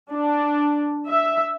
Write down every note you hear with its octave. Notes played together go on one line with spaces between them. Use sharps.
D4
E5